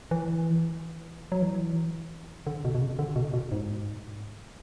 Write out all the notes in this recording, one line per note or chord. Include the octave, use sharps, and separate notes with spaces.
E3
F#3
E3
D3
B2
B2
C#3
D3
B2
B2
G#2